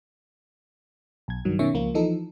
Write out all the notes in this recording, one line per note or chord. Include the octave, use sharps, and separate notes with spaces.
B1 G#6
G2 D#3 F#3
B2 D#3 C#4 E5 C#6
C#2 F3 A#3 F4
E3 F3 D#4 A4